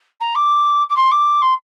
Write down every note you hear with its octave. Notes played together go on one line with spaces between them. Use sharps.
A#5
D6
D6
C6
D6
C6